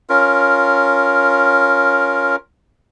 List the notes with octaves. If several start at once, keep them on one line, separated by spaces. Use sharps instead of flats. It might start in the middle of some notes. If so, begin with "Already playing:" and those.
C#4 F4 A#4